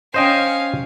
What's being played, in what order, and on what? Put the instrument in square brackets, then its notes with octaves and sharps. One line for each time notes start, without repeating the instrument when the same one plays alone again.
[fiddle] C#4 F5 [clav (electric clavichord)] C5 D#5 G5